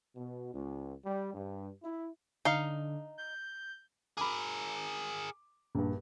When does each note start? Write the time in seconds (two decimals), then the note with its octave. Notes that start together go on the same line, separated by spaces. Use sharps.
0.16 B2
0.54 C#2
1.04 G3
1.34 G2
1.84 E4
2.45 D3 D#4 F5
3.18 G6
4.17 G#4 A#4 B5 D6
5.75 A#1 G2